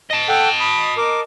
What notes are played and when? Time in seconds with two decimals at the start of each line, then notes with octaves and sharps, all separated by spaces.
0.11 D#5 A5
0.29 A4 F#5 G5
0.60 B5 D#6
0.97 A#4 D6